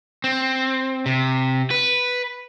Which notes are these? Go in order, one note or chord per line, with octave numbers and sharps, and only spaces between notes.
C4
C3
B4